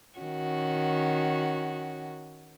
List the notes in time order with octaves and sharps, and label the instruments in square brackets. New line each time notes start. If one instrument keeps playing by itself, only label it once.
[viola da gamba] D#3 C#4 F#4